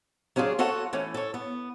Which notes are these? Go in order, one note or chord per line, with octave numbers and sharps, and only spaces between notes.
F#3 C#4 D4 F4 G#4
F4 F#4 A4 C#5 F#5
E3 A3 C#4
A4 C#5
B3